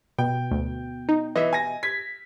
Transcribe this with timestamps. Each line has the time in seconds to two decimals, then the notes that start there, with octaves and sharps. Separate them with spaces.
0.18 B2 G5
0.51 D2
1.09 D#4
1.36 E3 D#5 E5
1.53 G#5 A#6
1.83 G#6 B6